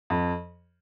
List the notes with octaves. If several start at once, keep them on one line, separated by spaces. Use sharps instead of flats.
F2